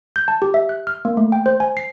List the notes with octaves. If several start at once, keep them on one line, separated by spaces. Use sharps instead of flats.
G6
A5
G4
E5
F#6
F6
A#3
A3
G5
C5
G#5
C7